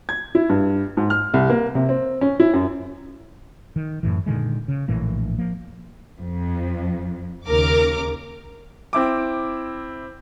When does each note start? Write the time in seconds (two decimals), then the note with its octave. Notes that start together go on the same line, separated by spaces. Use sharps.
0.09 G#6
0.35 E4
0.49 G2
0.97 G#2
1.10 F6
1.34 C2
1.50 A#3
1.75 C3
1.89 C4
2.21 C#4
2.40 E4
2.54 F#2
3.76 D#3
4.03 F#2 A2 E3
4.26 A#2 D3 D#3 G#3
4.68 C#3
4.88 A#1 A2 E3 A#3
5.38 F3 A#3
6.19 F2
7.46 D#2 C#3 A#4 D6
8.93 C4 E4 D6